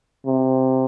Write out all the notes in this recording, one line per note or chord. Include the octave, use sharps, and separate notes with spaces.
C3